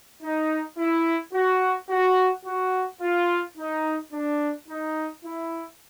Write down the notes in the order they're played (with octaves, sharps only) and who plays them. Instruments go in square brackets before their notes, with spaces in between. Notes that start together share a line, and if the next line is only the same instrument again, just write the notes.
[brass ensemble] D#4
E4
F#4
F#4
F#4
F4
D#4
D4
D#4
E4